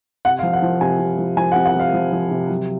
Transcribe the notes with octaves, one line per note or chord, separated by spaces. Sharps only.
C3 F#5
F5
F3
F#5
F3
C3 G#5
C3
F3
F3 G#5
F#5
C3
F#5
C3 F5
F3
F3
C3
F#3